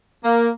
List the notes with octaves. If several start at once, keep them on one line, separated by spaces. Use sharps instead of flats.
A#3